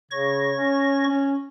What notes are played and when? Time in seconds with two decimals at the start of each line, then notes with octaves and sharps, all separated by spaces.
0.11 C#3 C#5 C#6 A#6
0.57 C#4
1.08 C#4